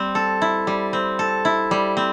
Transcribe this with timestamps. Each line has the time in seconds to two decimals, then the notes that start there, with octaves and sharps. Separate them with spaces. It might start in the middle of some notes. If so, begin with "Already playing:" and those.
Already playing: G3 C4
0.15 A4
0.42 E4
0.67 G3
0.93 C4
1.19 A4
1.45 E4
1.71 G3
1.97 C4